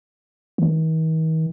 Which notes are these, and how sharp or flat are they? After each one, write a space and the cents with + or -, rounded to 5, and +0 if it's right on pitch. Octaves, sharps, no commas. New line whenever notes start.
D#3 +45